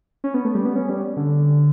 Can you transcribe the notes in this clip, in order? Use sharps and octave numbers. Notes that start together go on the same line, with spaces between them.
C#4
B3
A3
G3
B3
C#4
G3
D3